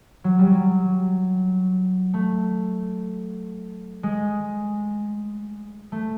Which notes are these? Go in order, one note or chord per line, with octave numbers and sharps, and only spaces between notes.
F#3
G3
F#3
A3
G#3
A3